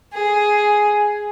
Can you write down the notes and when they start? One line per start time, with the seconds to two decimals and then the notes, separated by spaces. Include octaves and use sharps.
0.13 G#4